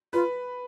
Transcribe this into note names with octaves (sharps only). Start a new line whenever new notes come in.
F4 B4